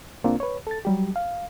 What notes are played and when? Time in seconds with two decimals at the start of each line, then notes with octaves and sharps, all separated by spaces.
0.24 C2 A#3 C4 D4 F4
0.40 B4 C#5
0.67 A4 A6
0.85 F#3 G3 G4
1.16 F5